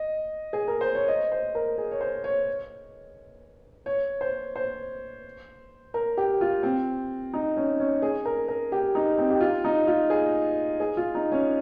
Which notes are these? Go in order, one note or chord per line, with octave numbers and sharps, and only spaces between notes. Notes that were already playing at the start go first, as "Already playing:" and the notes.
Already playing: D#5
G#4
A#4
C5
C#5
D#5
C5
A#4
G#4
C#5
C5
C#5
C#5
C5
C5
A#4
G4
F4
C4
D#4
C#4
C#4
G#4
A#4
A#4
G4
D#4
C4
G4
F4
D#4
F4
G#4
G#4
F4
D#4
C#4